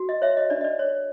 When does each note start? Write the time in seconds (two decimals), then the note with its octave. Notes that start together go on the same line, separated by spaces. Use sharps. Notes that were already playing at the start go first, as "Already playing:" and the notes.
Already playing: F#4
0.09 D#5
0.22 C#5 E5
0.37 D#5
0.50 D4 D5
0.61 D#5
0.64 D5
0.79 C#5